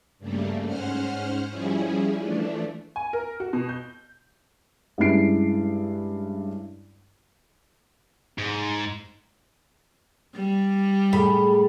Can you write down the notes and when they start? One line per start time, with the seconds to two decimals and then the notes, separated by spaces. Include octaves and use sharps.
0.19 G2 C#3 G3 A3 A#3
0.66 G#2 C#4 C5 F#5 F6
1.48 F3 G3 C#4 E4 G#4
2.16 E3 F3 A3 D4
2.96 G#5
3.13 A#4
3.40 F#4
3.53 B2
3.69 G6
4.98 G2 G#3 C#4 E4 C7 D7
8.38 G#2
10.35 G3
11.13 A2 G#3 A3 B5